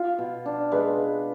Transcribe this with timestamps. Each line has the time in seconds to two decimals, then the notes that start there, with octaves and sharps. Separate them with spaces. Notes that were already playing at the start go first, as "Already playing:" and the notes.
Already playing: F4
0.18 B2
0.46 D4
0.72 G#3 B4